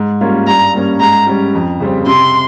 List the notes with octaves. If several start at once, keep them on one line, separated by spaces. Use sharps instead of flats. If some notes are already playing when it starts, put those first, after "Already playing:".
Already playing: G#2
G3 A#3 C#4 F4
G2 A#5
G3 A#3 C#4
G#2 A#5
G3 C#4
F2
C#3 G3 C4
C3 C6